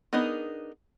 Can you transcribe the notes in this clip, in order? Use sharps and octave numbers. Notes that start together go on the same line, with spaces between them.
B3 D4 D#4 G#4 A#4